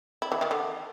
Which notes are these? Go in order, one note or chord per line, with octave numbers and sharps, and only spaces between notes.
E4
E3
D#3
D3